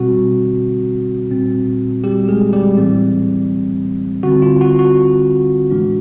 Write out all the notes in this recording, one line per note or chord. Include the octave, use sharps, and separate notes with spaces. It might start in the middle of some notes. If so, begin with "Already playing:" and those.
Already playing: B2 G3 C4 F#4
A#2 G3 C4
G3 G4
G#3 G#4
G3 G4
A2 E3 G3 C4
D3 G3 C4 F#4
F4
F#4
F#4
A2 E3 G#3 B3 D4